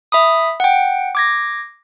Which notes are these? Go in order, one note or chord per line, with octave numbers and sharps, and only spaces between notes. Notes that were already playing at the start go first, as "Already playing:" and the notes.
E5 B5 D#6
F#5 G5
D6 G#6 A#6